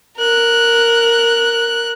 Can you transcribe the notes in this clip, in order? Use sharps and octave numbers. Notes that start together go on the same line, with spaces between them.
A#4 F#6